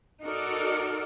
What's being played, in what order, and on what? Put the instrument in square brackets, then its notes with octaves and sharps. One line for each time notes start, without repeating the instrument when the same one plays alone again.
[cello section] D#4 F#4 A4 A#4 D5